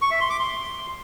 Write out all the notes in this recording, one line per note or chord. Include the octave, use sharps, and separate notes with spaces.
C#6
E5
C6
D6
C6